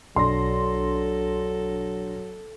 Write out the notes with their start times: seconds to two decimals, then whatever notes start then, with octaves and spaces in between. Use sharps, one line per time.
0.16 B1 F#3 D4 A4 C6 A#6